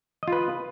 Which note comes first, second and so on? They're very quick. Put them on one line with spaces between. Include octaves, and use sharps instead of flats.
D#5 F4 B4